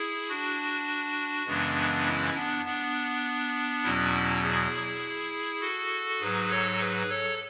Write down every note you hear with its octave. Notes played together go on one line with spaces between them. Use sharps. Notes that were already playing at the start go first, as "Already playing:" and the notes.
Already playing: E4 G#4
D4 F#4
F#2 C#3 E3 G#3 B3 D4
C#4 E4
B3 D4
B3 D4
E2 B2 F#3 C#4 E4
E4 G#4
F#4 A4
G#2 F#3 G#4 B4
A4 C#5
G#4 B4
A4 C#5